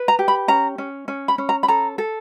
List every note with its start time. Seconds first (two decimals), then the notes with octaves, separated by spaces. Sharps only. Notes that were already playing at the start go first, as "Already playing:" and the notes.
Already playing: B4
0.08 A#5
0.19 G4
0.28 B5
0.48 C#4 A#5
0.78 C#4
1.08 C#4
1.28 B5
1.38 C#4
1.49 A#5
1.63 B5
1.68 A4 A#5
1.98 A4